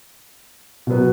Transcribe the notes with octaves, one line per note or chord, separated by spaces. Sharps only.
B2 F#3 B3